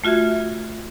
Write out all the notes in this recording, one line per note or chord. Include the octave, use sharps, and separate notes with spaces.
A3 F4 F#4 E5 G#6